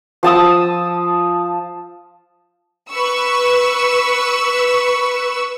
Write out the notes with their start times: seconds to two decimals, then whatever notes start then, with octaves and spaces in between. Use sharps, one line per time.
0.23 F3 A5 D#6 E6
2.90 B4 C#6 E6